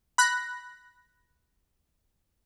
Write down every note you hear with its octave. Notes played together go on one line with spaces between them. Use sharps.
B5 F#6 A#6